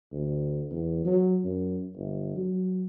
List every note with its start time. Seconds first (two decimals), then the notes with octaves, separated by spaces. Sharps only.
0.12 D2
0.71 E2
1.05 F#3
1.44 F#2
1.97 G1
2.36 F#3